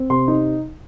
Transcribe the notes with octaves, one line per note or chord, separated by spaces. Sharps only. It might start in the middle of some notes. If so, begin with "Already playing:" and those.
Already playing: C4
C3 C6
D#4